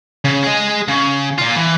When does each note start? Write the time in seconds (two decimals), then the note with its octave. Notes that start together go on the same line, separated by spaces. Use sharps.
0.25 C#3
0.44 G#4 D#5
0.88 C#3
1.38 A#2 F4
1.56 E3